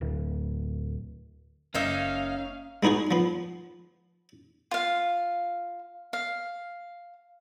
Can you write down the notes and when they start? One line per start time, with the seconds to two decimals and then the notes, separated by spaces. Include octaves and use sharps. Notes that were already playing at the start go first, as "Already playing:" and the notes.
0.01 D1
1.75 F#1 A#3 C#4 D#4 E5 F5
2.83 G#3 B3 D#4 F#4 G#4
3.11 F3 B3
4.71 F4 F5
6.13 F5